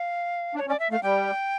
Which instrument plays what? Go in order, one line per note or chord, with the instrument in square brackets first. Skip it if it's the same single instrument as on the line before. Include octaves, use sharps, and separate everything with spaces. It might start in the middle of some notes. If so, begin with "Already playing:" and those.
Already playing: [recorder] F5
[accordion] D4
[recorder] C#5
[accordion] C#4 [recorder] D5
[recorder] E5
[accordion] A3 [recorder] F5
[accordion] G3 [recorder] G5